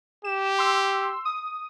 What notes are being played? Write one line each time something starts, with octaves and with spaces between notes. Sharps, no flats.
G4 E7
C6 E6
D#6